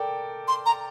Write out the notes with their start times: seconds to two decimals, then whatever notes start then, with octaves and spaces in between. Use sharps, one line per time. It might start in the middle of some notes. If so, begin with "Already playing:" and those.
Already playing: A4 A#4 D5 G5
0.48 C6
0.66 A#5